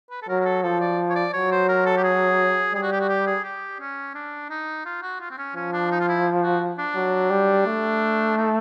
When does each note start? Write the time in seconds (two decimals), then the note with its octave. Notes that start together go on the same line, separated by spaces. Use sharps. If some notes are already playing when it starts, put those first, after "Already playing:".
0.10 B4
0.22 A4
0.29 F#3 A#4
0.41 A#4
0.45 A4
0.63 F3 A4
0.80 D5
1.10 C#5
1.16 D5
1.33 F#3 C#5
1.52 C5
1.69 A#4
1.86 A4
1.97 G4
2.04 G#4
2.74 G3 G#4
2.83 F#4
2.92 G4
3.01 F#4
3.09 G4
3.27 G#4
3.44 G4
3.80 C#4
4.15 D4
4.50 D#4
4.86 F4
5.02 F#4
5.21 F4
5.31 C4
5.38 C#4
5.55 F3 C#4
5.73 D4
5.91 D#4
6.00 F4
6.08 E4
6.43 F#4
6.79 D4
6.95 F#3
7.30 G3
7.67 A3
8.37 D#4